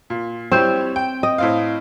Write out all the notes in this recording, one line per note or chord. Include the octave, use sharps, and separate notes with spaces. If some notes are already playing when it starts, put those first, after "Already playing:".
A#2
G3 C4 E4 C5 C#5
G5
D#5
A2 C4 F5